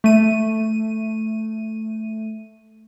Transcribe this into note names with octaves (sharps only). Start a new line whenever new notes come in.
A3 D#7